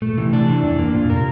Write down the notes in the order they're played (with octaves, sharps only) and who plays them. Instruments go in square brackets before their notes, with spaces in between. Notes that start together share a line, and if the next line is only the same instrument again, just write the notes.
[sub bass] A#2 [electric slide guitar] A3
[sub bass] A#2
[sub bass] C3 [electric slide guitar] E3
[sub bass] C3 [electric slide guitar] D4
[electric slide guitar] E3
[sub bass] F2 [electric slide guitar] D4
[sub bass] F2 [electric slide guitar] A#3
[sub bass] A2 [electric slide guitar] F4
[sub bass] A#2 [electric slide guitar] A#4
[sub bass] C3